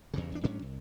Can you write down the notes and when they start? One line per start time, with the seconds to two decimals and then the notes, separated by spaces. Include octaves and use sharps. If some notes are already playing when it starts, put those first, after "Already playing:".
0.14 E2 G2 C#3
0.32 E2 D4
0.44 G#2 F#3 C#4 D4
0.62 C2